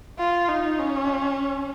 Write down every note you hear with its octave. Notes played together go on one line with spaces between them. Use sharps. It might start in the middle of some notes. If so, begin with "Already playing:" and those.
F4
D#4
C#4